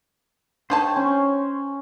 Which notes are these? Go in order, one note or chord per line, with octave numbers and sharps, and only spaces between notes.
D4 D#4 C5 C#5 G5 A5
C#4